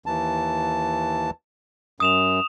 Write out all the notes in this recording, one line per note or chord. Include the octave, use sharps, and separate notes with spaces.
D#2 E3 A5
F#2 D#6 E7 F7